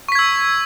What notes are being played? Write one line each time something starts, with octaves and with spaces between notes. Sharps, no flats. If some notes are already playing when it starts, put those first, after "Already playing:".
C#6 E6 G#6 B6